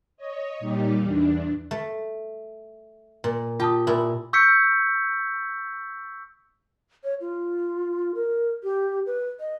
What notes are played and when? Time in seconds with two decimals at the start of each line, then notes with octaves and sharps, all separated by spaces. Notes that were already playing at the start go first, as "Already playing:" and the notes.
0.17 C#5 D#5
0.59 A#2 G3 D#4 G4
0.99 E2 D4
1.71 A3
3.24 A#2
3.60 F4 G4 A5 D#6
3.87 A#2 E4
4.33 C#6 E6 G6 B6 C#7
7.04 C#5
7.21 F4
8.15 A#4
8.63 G4
9.06 B4
9.40 D#5